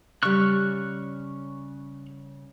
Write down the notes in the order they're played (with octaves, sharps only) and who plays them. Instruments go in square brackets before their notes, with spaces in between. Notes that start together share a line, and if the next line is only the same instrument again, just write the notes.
[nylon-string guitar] C#3 G3 [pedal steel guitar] C#6 F6 F#6